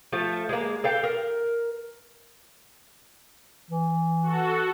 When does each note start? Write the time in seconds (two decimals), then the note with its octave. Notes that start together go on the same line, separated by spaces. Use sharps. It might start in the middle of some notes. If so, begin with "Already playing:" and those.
0.13 F3 A3 A4
0.49 G#3 A#3
0.84 A4 F5 G5
1.04 A#4
3.71 E3
4.22 F#4 A4